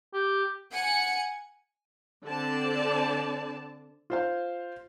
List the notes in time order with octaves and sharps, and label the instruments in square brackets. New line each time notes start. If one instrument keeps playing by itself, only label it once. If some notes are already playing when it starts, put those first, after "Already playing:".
[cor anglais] G4
[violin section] F#5 G#5 C#7
[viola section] D3 C4 D5 A5
[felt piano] F4 C5 F5